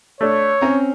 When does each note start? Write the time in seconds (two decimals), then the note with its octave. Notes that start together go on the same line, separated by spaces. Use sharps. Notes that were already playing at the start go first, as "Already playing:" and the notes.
0.21 A3 D4 C#5
0.61 C4 C#4 A#5